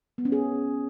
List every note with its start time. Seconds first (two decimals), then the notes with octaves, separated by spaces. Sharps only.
0.18 B3
0.25 C#4
0.32 G#4